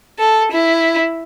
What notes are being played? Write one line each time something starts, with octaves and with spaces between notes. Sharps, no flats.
A4
E4